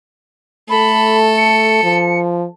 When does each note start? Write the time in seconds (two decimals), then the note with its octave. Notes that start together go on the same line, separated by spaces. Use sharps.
0.70 A3 A4 B5
1.37 C#7
1.83 F3